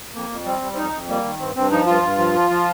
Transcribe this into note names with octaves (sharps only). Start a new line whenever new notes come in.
F2 A#3
F2
G3 C4
G3
C4
F2 D#4
F2
G3 A#3
D#3
G2 C4
G2 C4
F3 D#4
G2 F4
G2
F3
F3
F3